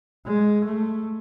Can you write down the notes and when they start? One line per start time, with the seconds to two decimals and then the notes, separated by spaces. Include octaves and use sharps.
0.26 G#3
0.65 A3